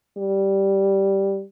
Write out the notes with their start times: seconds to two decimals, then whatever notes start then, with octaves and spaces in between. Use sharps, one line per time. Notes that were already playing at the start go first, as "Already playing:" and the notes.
0.18 G3